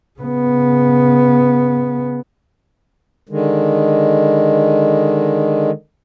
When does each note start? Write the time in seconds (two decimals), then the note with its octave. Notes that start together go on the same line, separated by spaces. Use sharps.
0.20 C#3 B3
3.29 D3 D#3 G#3